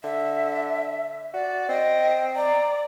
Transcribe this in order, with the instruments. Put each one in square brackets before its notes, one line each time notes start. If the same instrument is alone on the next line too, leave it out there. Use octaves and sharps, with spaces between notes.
[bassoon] D3 [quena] E5
[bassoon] F#4 [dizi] D5
[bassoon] C4 [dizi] D#5 [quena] G5
[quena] D5 [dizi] A#5